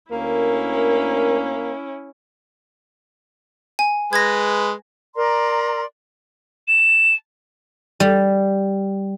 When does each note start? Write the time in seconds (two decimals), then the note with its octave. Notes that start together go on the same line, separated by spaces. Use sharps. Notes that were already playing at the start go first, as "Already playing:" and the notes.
0.12 D2 A#3 C#4 E4 A#4
3.79 G#5
4.13 G#3 B4 G#6 A#6
5.15 A#4 D5 A#5 C6
6.67 E7
8.00 G3